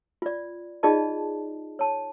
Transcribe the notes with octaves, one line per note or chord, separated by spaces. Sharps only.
F4 D5
D#4 F4 G#4 D5 D#5 A5
C#5 A5